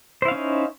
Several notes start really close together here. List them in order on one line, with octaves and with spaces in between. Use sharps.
C5 E4 F5 C#4 D#4